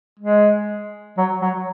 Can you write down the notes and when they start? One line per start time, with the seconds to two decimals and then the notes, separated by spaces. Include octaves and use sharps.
0.19 G#3
1.18 F#3
1.42 F#3